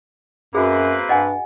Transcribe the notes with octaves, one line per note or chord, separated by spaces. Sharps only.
F#2 A#3 C4 F#4 G#4 B4
G2 D#5 F#5 G#5